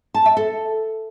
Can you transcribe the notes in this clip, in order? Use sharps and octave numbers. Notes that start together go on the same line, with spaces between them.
A5
E5
A4